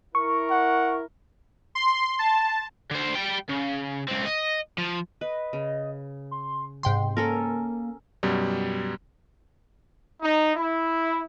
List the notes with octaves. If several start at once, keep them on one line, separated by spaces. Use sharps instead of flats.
E4 A#4 C#6
F#5
C6
A5
D3 C5
G3 G5
C#3
C#2 C4
D#5
F3
B4 D#5
C#3
C6
G#2 C3 G5 C6
A#3 C#4 A4 A#4
F#2 B2 G3
D#4
E4